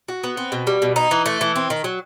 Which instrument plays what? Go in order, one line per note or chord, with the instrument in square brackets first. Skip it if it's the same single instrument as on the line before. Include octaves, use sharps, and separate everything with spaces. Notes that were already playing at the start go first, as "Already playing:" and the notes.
[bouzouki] F#4
B3
C4
B2
G3
B2
D#4
E3
A3
E3
C4
D#3
F#3